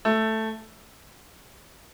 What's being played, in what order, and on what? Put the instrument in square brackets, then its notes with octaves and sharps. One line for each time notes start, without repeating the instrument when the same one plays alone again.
[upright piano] A3